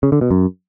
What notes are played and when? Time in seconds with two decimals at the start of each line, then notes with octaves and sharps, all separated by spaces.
0.03 C#3
0.12 D3
0.21 B2
0.31 F#2